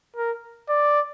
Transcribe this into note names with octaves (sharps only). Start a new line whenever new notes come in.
A#4
D5